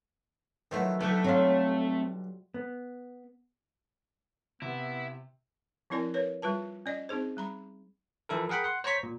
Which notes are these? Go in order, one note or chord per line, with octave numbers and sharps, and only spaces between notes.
D#3 F3 F#3 A3 B3 E4
B1 D3 A3 G4 A4 B4
F#3 G3 C4 F4 F5
B3
C3 B3 E4
F3 C4 E4 A#4 D5 G#5
A#4 B4 C#5
G3 F4 B4 A5
C#4 D5 D#5
C4 D#4 G#4 C5
G3 A#5 B5
E3 F3 E4 A4 A#4
G#4 A#4 F#5 G5 B5
F#5 C6
C5 C#5 A#5 C#6 B6
A#2